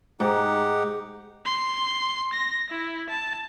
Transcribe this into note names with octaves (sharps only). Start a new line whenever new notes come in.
G#2 D#4 G4 G#4 F#5
C6
A#6
E4
A5